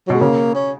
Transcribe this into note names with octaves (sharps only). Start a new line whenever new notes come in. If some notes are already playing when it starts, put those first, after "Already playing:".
F#3
B2 G#3
C#3 A#3
C#4